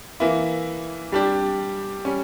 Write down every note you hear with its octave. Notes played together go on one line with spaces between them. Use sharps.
E3 A#3 E4
G3 D4 G4
G3 C#4